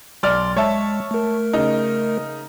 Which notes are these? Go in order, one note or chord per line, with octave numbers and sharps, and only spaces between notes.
B1 D5 C6 F6
G#3 C#5 E5 A5
A3 A#4
C#3 D#4